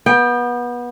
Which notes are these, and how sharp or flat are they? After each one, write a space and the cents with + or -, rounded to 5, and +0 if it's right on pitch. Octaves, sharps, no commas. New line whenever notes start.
B3 -25 G5 +15